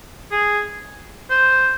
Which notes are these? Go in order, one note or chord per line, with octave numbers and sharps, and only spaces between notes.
G#4
C5